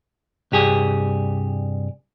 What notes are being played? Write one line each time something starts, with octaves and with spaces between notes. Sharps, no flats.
C2 G2 G4 G#4